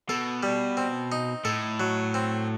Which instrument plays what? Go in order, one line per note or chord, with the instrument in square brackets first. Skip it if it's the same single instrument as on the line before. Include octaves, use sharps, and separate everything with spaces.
[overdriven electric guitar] B2 [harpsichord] A4
[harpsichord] G3
C4
D#4
[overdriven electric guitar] A2 [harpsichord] A4
[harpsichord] F#3
C4